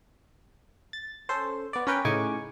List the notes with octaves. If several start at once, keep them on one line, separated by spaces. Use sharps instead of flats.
A6
C#4 A4 C5
B3 D5
C#4 A#4 B4 G5
A2 C#3 D#4 G#5 C#6 D6